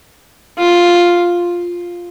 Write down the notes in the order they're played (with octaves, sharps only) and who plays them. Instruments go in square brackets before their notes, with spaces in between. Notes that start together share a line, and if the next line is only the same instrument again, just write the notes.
[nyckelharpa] F4